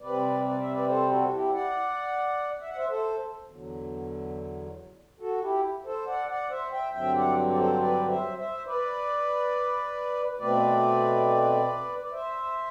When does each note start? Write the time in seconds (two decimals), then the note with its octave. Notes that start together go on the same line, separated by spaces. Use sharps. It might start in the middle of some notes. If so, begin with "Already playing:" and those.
0.01 C3 G3 C4 B4 D5
0.45 D5
0.58 E5
0.71 B4 D5
0.87 A4 C5
1.09 F#4 A4
1.31 E4 G4
1.52 D5 F#5
2.61 E5
2.69 F#5
2.77 C5 E5
2.89 A4 C5
3.47 E2 D3 F#3
5.20 F#4 A4
5.41 E4 G4
5.85 A4 C5
6.07 D5 F#5
6.28 D5 F#5
6.50 C5 E5
6.71 E5 G5
6.93 G2 D3 F#3 C4 E5 G5
7.14 D5 F#5
7.51 D5
7.58 A4 C5
7.80 B4 D5
8.08 C5 E5
8.37 C5 E5
8.66 B4 D5
10.39 B2 A3 C4 B4 D5
12.00 D5
12.12 C5 E5